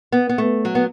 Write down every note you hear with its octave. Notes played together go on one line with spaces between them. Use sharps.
B3
B3
A3
F#3
B3